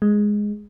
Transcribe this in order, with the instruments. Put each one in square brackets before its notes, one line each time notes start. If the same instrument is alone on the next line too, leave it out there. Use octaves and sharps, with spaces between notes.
[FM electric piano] G#3